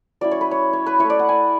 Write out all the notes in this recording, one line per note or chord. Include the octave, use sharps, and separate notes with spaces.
F#3 C#4 E4 D5
C#5
B4
C#5
C#5
B4
A3 E4 C#5
D5
F#5
G#5